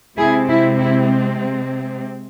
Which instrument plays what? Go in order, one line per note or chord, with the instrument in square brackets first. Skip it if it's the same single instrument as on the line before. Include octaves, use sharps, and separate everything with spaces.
[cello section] C3 G#3 C4 E4 G#4
E4
E4